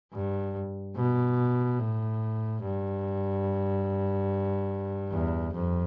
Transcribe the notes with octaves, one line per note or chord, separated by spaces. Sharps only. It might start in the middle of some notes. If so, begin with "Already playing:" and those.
G2
B2
A2
G2
E2
F2